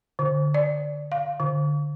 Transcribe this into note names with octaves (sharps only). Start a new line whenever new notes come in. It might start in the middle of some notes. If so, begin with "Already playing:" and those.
D3
D5
F5
D3